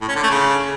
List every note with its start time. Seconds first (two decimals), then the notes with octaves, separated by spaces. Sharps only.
0.01 A2
0.08 C#4
0.16 D3
0.23 A3
0.30 C#3